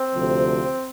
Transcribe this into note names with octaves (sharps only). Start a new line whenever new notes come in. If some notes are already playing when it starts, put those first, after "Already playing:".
Already playing: C4
D2 C3 F3